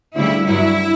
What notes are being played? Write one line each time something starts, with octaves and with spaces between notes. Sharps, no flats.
D2 C#3 G3 E4
G2 F#3 E4